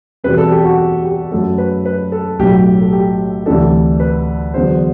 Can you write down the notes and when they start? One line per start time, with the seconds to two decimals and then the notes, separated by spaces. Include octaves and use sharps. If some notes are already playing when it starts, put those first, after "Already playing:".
0.24 E2 B2 G3 C4 B4
0.38 A4
0.51 G4
0.65 F#4
1.04 G4
1.31 F#2 F#3 A3 A4
1.58 B4
1.85 B4
2.12 A4
2.39 B1 A2 F#3 G4
2.82 A4
2.93 G4
3.46 D2 C3 E3 G3 D4 A4
4.00 B4
4.54 E2 D3 F#3 B3 C5